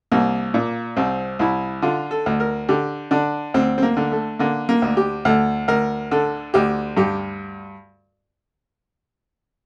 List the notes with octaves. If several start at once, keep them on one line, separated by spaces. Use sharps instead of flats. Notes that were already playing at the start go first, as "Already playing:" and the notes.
C2 A#3
A#2 A#3
C2 C4
C2 E4
D3 F4
A4
D2
A#4
D3 G4
D3 D4
D2 C4
C4
A#3
D3
A3
D3 A#3
A#3
D2
G4
D2 A4
D2 A#4
D3 A4
D2 G4
G2 G4